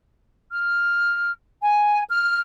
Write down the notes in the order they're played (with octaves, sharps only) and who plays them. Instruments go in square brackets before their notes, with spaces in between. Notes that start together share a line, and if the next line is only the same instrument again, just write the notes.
[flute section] F6
G#5
F6